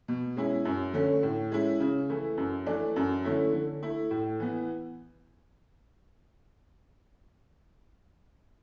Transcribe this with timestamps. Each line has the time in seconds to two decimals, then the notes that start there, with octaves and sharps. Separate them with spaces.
0.08 B2
0.37 G#3 C#4 E4
0.65 F#2
0.94 D3 A3 C#4
1.23 A2
1.52 G#3 C#4 E4
1.80 C#3
2.09 E3 A3 E4
2.37 F#2
2.66 E3 A3 D4
2.96 F#2
3.24 D3 A3 C#4 E4
3.53 D3
3.82 A3 E4
4.11 A2
4.40 E3 B3